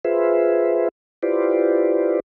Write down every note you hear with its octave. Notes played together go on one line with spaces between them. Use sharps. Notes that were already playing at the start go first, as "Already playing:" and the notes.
F4 G#4 B4 C5 E5
E4 F4 G4 B4 C5 D5